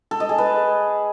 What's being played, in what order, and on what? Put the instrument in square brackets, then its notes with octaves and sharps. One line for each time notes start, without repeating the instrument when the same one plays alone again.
[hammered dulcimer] A4
D#5
G#4
B4